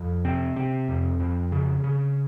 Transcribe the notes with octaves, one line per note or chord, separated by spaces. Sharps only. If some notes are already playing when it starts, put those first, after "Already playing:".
Already playing: F2
C3 C4
C3 C4
F2
F2
C#3
C#3